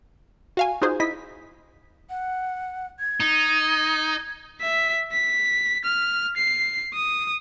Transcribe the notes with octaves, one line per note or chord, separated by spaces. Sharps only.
F#4 F5 G#5
D#4 F4 F#4 G#4 C5
E4 D#5 B6
F#5
G#6
D#4
E5 B6
B6
F6
C7
D#6